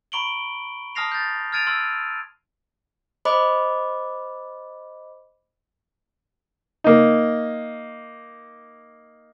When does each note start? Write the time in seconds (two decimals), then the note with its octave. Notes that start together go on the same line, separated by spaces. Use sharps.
0.12 A#5 B5 C#6 D7 F#7 G7
0.95 A5 D#6 F6 A#6 C7 F7
1.12 G6 A6
1.52 F6 G#6 A6 D7 D#7 F7
1.67 C6 E6 F6
3.25 C5 D#5 B5 D6
6.84 A#3 D#4